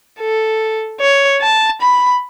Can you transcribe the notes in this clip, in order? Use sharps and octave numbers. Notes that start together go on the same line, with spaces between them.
A4
C#5
A5
B5